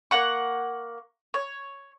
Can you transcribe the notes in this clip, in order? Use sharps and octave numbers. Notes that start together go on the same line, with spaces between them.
A#3 F#5 C#6
C#5